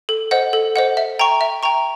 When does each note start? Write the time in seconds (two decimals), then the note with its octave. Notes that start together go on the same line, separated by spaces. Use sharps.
0.09 A4
0.31 C5 D#5 F#5
0.53 A4
0.76 C5 D#5 F#5
0.97 E5
1.19 G5 A#5 C#6
1.41 E5
1.63 G5 A#5 C#6